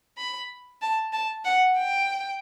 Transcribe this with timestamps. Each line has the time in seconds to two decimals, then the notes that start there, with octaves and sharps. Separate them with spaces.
0.17 B5
0.82 A5
1.13 A5
1.45 F#5
1.77 G5